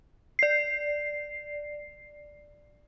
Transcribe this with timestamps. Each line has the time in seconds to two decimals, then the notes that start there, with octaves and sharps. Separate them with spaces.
0.39 D5 C7